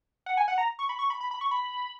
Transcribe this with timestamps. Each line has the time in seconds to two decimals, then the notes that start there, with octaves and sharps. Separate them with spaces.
0.26 F#5
0.37 G#5
0.48 F#5
0.58 A#5
0.79 C#6
0.89 B5
0.99 C#6
1.10 B5
1.21 B5
1.31 B5
1.41 C#6
1.51 B5